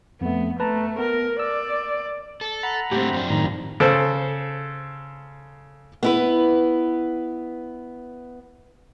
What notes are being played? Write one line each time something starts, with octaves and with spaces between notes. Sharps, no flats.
F2 A3 B3
A3 B4 A5 A#5
B3 A#4
D5 E6
A4
F#5 A#5 B5
A2 D3 A3 C4 G4
F#2 F3 D4
A2 D#3 A#5
C#3 A4 C5
B3 E4 B4